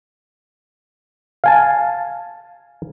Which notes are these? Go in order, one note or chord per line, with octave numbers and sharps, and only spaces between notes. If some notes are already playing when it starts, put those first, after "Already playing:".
F5 G#5 A5